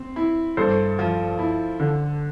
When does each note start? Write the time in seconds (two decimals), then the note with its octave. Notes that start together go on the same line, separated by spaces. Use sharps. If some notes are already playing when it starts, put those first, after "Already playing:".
Already playing: C4
0.16 E4
0.57 G2 A4 C5
0.99 F3
1.39 E4
1.80 D3